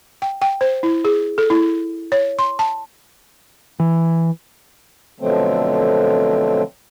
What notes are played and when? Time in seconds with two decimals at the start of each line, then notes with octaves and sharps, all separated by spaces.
0.22 G5
0.42 G5
0.61 C5
0.83 E4
1.05 G#4
1.38 A4
1.50 E4
2.12 C#5
2.39 C6
2.59 A5
3.80 E3
5.20 B2 D3 F3 F#3 A3 C4